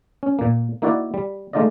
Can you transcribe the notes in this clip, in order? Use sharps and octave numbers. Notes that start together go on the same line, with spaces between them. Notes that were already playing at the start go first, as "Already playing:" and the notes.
C#4
A#2 A#3
A#3 D#4 E4 F#4 D5
G3
G#3 A3 D#4 F4 D5 D#5